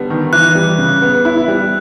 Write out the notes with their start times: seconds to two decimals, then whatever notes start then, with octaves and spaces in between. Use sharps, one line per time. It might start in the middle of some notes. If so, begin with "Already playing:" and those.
Already playing: D3 G3 B3
0.10 D#3
0.33 E3 F#6
0.55 G3
0.78 C#3
1.02 B3
1.25 E4
1.48 G3